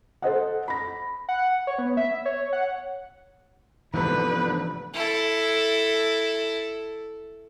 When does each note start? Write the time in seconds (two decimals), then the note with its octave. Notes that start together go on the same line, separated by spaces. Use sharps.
0.22 A4 C5 D#5 F#5
0.68 B5 A#6
1.29 F#5
1.67 C#5
1.78 B3
1.97 E5
2.26 C#5
2.53 F#5
3.94 G#2 C3 E3 F3 A3 B3 D4 B4
4.94 E4 A4